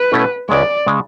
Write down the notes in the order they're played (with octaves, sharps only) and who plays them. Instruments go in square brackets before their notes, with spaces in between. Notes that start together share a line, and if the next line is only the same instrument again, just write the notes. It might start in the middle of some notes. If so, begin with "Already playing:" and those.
Already playing: [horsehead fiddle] B4
[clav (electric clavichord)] B2 A3 C#4 E4 A4
[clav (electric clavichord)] C#2 C#3 G#3 [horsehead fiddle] D5
[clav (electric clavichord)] C#3 G#3